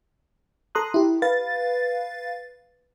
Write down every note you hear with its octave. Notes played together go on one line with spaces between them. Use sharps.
A4 A#5 C6 D#6 F#6
E4 G4
B4 F5 A6